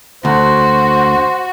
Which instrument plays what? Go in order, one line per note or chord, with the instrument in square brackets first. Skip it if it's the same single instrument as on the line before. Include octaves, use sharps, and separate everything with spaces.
[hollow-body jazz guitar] D2 [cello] F#4 [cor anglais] C5